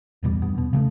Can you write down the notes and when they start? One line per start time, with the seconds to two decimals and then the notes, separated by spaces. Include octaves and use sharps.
0.23 D1 E2 B2 G3
0.42 D#1 G2 B3
0.58 B2
0.73 C#3 G#3 A3